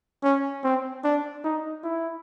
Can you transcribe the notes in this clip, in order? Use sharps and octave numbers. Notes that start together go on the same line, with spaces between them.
C#4
C4
D4
D#4
E4